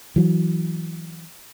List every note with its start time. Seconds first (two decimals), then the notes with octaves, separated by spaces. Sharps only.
0.16 E3 F#3